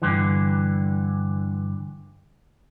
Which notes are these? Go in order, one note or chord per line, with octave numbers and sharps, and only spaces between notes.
G2 D3 E3